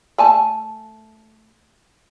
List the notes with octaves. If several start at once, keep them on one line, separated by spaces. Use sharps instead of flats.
A3 G#5 A5